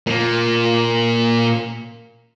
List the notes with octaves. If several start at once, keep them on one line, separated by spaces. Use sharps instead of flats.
A#2 A#3